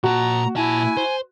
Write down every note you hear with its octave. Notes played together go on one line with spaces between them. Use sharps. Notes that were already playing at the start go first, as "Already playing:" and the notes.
A#2 F#4 A5 A#5
A#2 E4 G#5 A5
C5